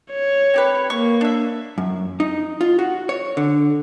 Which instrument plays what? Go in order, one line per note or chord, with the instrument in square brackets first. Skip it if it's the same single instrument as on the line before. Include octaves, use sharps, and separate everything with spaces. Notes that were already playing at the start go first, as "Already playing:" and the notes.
[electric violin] C#5
[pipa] C4 G4 B4
[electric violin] A#3 [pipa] C#6
[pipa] D4 E5
[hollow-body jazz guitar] F#2
D#4
F4
F#4
C#5
D3